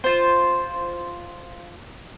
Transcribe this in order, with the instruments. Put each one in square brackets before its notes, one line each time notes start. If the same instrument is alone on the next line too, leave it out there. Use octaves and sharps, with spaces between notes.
[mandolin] F4 C5